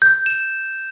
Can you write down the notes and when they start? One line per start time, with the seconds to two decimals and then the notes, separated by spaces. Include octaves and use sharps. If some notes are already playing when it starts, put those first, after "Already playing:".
0.02 G6
0.26 E7